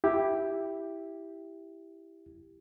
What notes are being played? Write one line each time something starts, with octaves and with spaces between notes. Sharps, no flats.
E4 G4